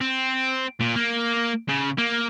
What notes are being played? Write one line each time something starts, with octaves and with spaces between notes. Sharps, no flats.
C4
A#2
A#3
C#3
A#3